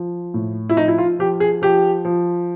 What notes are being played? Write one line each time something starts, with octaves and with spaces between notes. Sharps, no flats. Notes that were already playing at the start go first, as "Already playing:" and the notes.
Already playing: F3
A2
E4
F3 D#4
E4
F4
F3 G4
G#4
F3 G4
F3